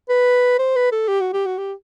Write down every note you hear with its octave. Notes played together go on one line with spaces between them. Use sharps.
B4
C5
B4
A4
G4
F#4
G4
F#4
G4